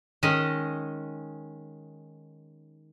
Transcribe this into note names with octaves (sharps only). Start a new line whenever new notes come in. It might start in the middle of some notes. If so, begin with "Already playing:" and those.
D#3 G#3 C#4 D#5